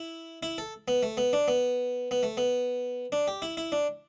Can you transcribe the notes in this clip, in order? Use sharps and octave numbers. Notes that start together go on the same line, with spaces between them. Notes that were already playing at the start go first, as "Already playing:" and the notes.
Already playing: E4
E4
A4
B3
A3
B3
D4
B3
B3
A3
B3
D4
G4
E4
E4
D4